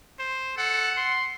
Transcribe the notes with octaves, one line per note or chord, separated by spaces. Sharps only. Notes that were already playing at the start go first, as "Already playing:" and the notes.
C5
A4 F#5
C6